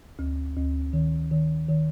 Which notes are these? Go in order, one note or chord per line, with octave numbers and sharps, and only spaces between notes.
D2
D2
D#3
D#3
D#3